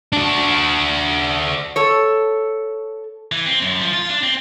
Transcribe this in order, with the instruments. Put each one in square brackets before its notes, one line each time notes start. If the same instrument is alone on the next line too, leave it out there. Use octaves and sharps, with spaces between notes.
[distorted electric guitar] D4 F#4
[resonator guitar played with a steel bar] A4 C#5
[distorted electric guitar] E3
C4
F#2
F3
F4
D4
C4